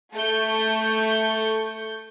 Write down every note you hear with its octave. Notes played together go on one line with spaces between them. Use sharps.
A3 A4 C#6 G6